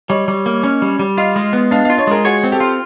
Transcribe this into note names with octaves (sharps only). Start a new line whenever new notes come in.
G3 C#5 D#5
G3
A#3
C#4
G3
G3
F4 D#5 F5
G#3
B3
D4 D#5 F5
D#5 F5
F4
C#5 D#5
G#3 G#4 A#4
F#4 G#4 C#5
C4
G4 A4
F4